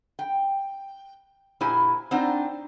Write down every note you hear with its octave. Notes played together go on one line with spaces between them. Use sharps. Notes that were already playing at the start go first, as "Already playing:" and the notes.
G5
A#2 E4 G4 C5 G#5
C4 D4 D#4 F4 C5 F#5